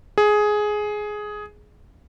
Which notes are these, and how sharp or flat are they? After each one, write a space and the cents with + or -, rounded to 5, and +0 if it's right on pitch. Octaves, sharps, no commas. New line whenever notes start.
G#4 +10